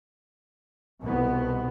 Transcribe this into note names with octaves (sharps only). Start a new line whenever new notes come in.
C2 B2 D#3 B3